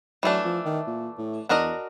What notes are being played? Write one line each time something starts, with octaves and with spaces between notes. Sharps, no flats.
E3 F#3 A3 D4
F3
D#3
A#2
A2
E2 D4 F#4 A#4 D#5